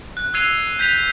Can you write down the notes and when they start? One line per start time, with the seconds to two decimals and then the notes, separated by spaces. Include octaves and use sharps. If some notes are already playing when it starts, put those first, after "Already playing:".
0.17 F#6
0.34 E6 F#6 G#6 C7 D#7 F7
0.79 G6 B6 F7